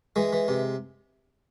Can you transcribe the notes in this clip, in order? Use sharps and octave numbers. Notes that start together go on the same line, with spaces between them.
E3 G#3
E3
C3